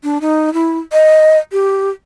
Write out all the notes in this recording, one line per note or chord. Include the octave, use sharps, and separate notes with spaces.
D4
D#4
E4
D#5
G4